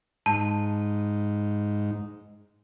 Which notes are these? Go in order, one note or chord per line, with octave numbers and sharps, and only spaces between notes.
G#2 A5